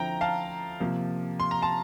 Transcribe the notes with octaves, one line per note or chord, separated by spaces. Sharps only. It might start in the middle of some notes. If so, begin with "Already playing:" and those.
Already playing: D3 F3 C4 E4 G5 A#5
F5 A5
C3 F3 A#3
C6
A#5
A5 C6